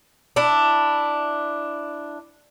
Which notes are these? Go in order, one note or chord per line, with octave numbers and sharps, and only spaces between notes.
D4 E4